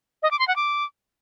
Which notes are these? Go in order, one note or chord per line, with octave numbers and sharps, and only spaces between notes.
D#5
D6
C6
F#5
D6